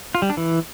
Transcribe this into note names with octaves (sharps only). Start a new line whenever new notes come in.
F4
G3
D4
E3